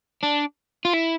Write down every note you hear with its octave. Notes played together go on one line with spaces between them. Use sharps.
D4
F4
E4